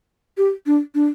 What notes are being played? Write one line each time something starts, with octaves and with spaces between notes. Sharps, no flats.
G4
D4
D4